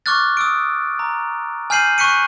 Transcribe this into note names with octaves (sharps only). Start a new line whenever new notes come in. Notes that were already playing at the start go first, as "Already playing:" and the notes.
C#6 D6 F6 F#6 A6
D#6 E6 D7
A#5
G#5 F6 G6 C7 D#7 F#7
C#6 F#6 B6 C#7 D#7